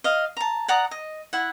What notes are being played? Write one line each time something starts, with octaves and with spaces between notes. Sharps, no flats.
D#5 F5
A5 A#5
D5 F#5 A#5 D#6
D#5
E4 F#5